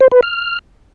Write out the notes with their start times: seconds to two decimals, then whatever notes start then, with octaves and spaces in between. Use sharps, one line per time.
0.01 C5
0.12 B4
0.23 F6